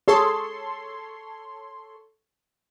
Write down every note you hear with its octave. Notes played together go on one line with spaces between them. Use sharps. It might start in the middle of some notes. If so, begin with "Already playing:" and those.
G#4 A4 C#5 C6